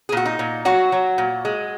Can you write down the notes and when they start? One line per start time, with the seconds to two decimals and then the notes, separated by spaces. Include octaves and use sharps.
0.09 G#4
0.12 A#2 F#4
0.26 D#4
0.39 A#2
0.65 F#3 F#4
0.92 F#3
1.18 A#2
1.45 G#3